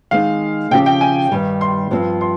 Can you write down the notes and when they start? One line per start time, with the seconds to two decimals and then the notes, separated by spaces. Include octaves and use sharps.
0.11 D#3 G#3 C4 D#4 F5
0.71 C#3 F3 C4 G4 G5
0.86 G5
1.01 G#5
1.32 G2 D#3 G3
1.61 C6
1.91 G2 F3 C4
2.21 C6